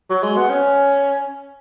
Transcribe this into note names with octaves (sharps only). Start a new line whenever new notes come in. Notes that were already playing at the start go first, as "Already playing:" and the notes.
F#3
G#3
B3
C#4